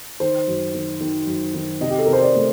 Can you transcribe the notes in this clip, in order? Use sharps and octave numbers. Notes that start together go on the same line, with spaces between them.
D#3 C5
F#2
D#3
D#3
F#2
D#3
C3 D#5
G4
A4
C3 A#4
C5
D5
A3